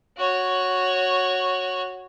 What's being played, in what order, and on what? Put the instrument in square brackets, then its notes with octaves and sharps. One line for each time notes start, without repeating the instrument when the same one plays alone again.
[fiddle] F#4 C#5